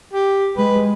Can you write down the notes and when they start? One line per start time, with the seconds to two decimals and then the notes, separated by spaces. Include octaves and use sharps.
0.14 G4
0.57 G#3 B4